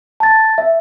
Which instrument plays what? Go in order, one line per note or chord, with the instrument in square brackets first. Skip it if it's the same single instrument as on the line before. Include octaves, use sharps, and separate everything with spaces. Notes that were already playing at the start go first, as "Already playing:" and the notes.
[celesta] A5 A6
E5